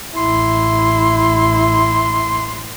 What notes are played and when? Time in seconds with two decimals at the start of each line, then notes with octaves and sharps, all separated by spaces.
0.17 A1 E4 C6